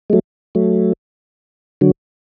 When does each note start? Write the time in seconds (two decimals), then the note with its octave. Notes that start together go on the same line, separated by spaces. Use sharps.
0.10 G#3
0.13 F#3 A3
0.55 F#3 A3
1.81 D3 F#3